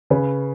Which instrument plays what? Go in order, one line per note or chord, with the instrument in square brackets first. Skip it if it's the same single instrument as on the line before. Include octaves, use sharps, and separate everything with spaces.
[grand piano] C#3 [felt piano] B4